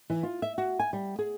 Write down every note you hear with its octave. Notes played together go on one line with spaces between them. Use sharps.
E3
F4
E5
F#4
G#5
G3
G#4